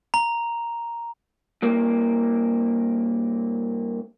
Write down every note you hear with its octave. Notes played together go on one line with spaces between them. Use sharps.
A#5
G2 A#3